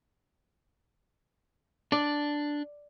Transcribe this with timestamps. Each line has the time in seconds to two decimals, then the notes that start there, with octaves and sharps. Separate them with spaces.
1.92 D4 D5